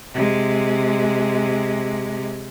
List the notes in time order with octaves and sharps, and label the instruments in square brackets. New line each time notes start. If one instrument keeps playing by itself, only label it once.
[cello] C3 G#3